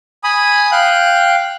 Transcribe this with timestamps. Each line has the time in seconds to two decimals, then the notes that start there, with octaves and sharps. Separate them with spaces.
0.24 G#5 B5 D#6
0.72 F5 G5 F#6